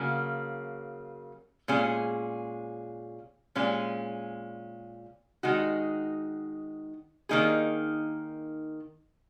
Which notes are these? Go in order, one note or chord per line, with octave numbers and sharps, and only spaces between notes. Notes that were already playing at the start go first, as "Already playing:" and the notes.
Already playing: C#3 F#3 A#3
A#2 G#3 C#4 G#4
A#2 G#3 C#4
D#3 G#3 D#4 F#4
D#3 A#3 D#4 G#4